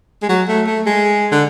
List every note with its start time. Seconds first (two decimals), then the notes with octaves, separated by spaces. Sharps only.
0.22 G#3
0.29 F#3
0.48 A3
0.67 A3
0.86 G#3
1.32 D3